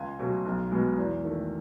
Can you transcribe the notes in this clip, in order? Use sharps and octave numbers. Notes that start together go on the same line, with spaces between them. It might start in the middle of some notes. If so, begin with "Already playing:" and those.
Already playing: C#2 G#5
B2 F#3 A3
B1
B2 G#3 B3
E2
D#3 A3